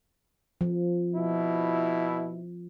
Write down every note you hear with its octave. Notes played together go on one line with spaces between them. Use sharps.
F3
B2 E4